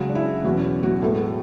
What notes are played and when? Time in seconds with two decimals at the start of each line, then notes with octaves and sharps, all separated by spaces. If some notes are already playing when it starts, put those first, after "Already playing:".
Already playing: C#3 F#3 G#3 C#4 F#4
0.09 D4
0.15 E4
0.44 E2 B2 F#3 C#4 F#4
0.83 F#3 F#4
1.02 A2 G#3 A3 B3 A4